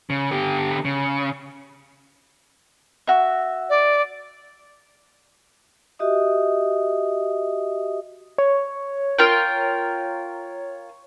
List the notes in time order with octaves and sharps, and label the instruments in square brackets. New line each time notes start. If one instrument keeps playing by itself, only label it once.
[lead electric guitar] C#3
D3 G4
C#3
[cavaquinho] F#4 E5
[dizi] D5
[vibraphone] F#4 G4 D#5 E5 D#6
[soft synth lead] C#5
[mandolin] F4 A#4 G5